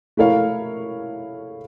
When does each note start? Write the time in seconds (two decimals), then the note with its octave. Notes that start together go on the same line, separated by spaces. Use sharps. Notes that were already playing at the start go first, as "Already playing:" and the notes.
0.17 A3 E4 A#4 C#5 F5